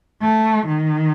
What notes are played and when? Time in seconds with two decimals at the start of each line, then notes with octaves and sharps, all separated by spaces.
0.21 A3
0.66 D#3